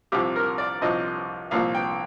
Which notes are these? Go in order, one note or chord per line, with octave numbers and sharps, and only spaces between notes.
C2 C3 F3 G4
A#4
D5
C2 C3 F3 D#5
C2 A#2 F3 F5
G5